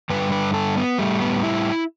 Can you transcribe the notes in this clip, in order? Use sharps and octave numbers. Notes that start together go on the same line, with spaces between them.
G2 D3 G3 B4
B4
A4
B3
A2 G3 A3
B3
E4